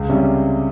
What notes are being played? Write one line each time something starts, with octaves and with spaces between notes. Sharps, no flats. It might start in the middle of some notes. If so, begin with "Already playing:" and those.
Already playing: C#2
C3 G3 C#4